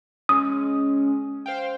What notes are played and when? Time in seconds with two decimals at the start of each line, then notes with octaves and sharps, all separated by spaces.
0.29 G#3 C#4 D#6
1.46 C5 F5 G5